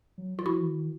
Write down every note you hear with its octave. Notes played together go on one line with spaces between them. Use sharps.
F#3
F#3 F4
F3 E4 F#4
E3
D#3